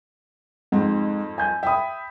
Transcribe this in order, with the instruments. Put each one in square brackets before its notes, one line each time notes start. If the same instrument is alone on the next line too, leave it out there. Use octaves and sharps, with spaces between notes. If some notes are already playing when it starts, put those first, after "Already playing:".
[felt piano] F2 C4 [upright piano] G#2
[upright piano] G#5 G6
[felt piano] E5 B5 [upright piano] G5 D#6